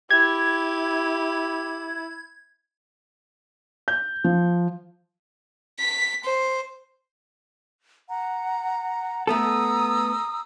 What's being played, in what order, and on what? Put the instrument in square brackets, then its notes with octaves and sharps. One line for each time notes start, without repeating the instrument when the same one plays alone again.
[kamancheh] E4 [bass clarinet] G4 [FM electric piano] G#6
[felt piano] G6
F3
[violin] B6
C5
[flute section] F#5 A#5
[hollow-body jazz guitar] A3 B3 A4 [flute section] A#5 D#6 E6